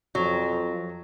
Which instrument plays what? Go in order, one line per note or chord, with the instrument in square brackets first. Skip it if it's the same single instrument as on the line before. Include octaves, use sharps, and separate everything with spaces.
[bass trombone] F2 [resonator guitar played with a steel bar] F#3